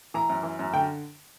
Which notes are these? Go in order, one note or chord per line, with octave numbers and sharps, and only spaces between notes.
E3 A#5
F#2
E3
F#2
D3 G5